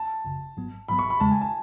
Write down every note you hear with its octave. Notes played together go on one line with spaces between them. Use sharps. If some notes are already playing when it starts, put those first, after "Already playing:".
Already playing: A5
G#1 F#2 C#3
G#1 G#2 F#3 B3
G#1 G#2 F#3 B3 B5
C#6
B5
E2 C#3 G#3 A5
G#5
A5